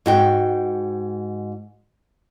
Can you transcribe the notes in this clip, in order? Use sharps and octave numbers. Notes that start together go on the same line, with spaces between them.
G#2 F#4 G5